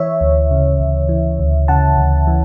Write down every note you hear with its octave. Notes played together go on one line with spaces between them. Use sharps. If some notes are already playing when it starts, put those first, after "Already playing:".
Already playing: E3 C#5 E5
D2
C#3
D2
E3
D2
C#3 F#5 A5
D2
E3